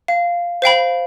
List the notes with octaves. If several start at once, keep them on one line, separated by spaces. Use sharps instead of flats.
F5
C5 F5 G5 B5